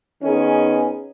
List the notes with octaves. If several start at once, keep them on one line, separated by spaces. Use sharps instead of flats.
D#3 B3 C#4 D#4 G#4